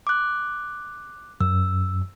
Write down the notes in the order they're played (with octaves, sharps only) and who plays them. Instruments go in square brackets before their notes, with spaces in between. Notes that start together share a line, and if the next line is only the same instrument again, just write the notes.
[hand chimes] D6 F#6
[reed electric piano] F#2 [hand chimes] E6